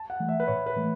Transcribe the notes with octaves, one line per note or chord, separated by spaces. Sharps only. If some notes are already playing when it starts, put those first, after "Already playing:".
Already playing: A5
F#5
E3 A3
E5
B4
A2 C#5
B4
E3 A3